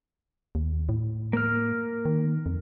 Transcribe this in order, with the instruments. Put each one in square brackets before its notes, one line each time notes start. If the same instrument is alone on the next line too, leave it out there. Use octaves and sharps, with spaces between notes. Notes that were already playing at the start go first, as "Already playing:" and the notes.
[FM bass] D#2
A2
[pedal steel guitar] A#3 F6
[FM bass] D#3
F2